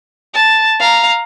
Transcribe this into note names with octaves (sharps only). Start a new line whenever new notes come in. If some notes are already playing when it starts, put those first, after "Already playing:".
A5
F5 A#5